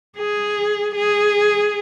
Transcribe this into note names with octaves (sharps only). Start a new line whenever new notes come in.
G#4
G#4